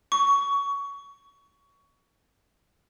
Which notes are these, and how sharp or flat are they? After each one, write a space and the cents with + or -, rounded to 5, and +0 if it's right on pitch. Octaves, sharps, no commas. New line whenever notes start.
C#6 +20